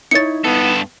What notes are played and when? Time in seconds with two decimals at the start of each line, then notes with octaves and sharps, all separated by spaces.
0.11 D#4 E4 C#5 A6 C#7
0.45 G2 B3 A4